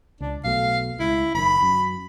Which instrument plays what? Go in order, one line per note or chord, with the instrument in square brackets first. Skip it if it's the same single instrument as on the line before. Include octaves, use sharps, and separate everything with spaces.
[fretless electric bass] C#2 [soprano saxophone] D4
[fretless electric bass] B1 B2 A3 [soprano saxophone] F5
[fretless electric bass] C#2 [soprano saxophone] E4
[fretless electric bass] F#1 D#3 [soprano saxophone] B5
[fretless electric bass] F#2